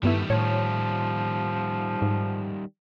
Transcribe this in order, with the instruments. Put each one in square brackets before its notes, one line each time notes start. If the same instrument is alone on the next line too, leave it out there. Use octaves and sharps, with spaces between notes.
[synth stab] G2 B3 E4 [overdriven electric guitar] D#3 G3 [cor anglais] A3
[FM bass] A2 [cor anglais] F3 [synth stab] C#5
[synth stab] G#2